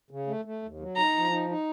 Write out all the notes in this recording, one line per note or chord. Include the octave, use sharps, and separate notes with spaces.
C#3
A3
A3
D#2
F#3
D#4 A#5
F3
D#4
D#4